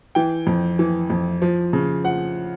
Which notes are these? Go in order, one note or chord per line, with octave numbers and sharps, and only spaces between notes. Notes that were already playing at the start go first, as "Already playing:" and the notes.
E3 G5
F2
E3
F2
F3
C#3
F3 F#5